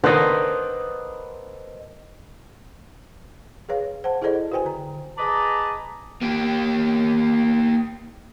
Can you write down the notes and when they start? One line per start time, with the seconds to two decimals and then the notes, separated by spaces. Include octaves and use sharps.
0.04 D3 D#3 B4 C5 D#5
3.69 G#4 B4 C#5 F5
4.04 C5 F#5 A5
4.22 E4 G#4 A4 C5 D5 D#5
4.52 F#4 B4 C5 G5 G#5
4.65 D3 A#5
5.18 G#4 B4 D5 D#5 A5 A#5
6.22 A#3 G4